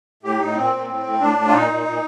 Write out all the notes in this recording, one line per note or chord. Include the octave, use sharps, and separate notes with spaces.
A2 G4
A2 D#4
A#2 C4
A#2
A2
A2
A2 D4
A2
F4
A#2 D#4
A#2
A#2